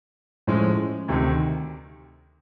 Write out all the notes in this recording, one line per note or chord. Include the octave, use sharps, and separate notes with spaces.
A2 F3 G#3 C#4
D2 C3 D#3